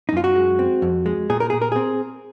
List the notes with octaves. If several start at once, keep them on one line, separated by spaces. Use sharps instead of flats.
D#4
F#2 F4
F#4
G#3
C4
F2
G#3
A#2 G#4
A#4
A#2 G#4
A#4
C4 G#4